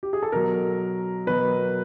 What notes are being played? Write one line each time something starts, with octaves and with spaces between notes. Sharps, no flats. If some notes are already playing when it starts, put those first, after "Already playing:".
G4
G#4
A4
B2 F#3 A#4
B2 F#3 B4